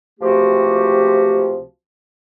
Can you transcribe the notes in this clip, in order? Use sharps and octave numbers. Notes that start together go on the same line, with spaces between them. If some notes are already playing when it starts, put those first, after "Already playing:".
C#2 C3 F3 A3 F#4 G4